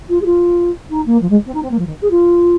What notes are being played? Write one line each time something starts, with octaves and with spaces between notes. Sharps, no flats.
F4
G#4
F4
D#4
A#3
F3
G#3
C4
D#4
C4
A#3
F3
D#3
G#4
F4